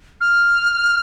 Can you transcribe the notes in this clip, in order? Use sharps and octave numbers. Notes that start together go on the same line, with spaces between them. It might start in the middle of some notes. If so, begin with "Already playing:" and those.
F6